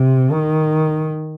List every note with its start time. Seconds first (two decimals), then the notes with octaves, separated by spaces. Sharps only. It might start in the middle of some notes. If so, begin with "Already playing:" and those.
Already playing: C3
0.31 D#3